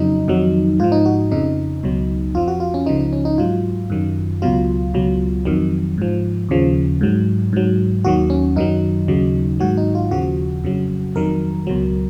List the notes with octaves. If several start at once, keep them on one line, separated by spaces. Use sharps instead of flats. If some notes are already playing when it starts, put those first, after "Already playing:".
Already playing: F2 C#3 F#3 D#4
F2 D#3 F#3
G#2 F3 F4
D#4
F#4
F2 C#3 F3 D#4
C#2 B2 F#3
F2 F3 F4
F#4
F4
C#4
C#2 C#3 F3 D#4
D#4
C#4
D#4
G#2 F#3 F4
F#2 D#3 F#3
C#2 B2 F#3 F4
C#2 B2 F#3
F2 D#3 F#3
G#2 F3
D#2 C#3 F3
G#2 F#3
G#2 F#3
D#2 D#3 F#3 F#4
C#4
F#2 D#3 F#3 D#4
D#2 C#3 F#3
G#2 D#3 F#3 F#4
D#4
F4
D#2 C#3 F3 F#4
F2 C#3 F#3
F2 D#3 F#3 A#4
C#2 B2 F#3